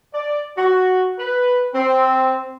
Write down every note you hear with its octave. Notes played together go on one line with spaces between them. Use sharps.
D5
F#4
B4
C4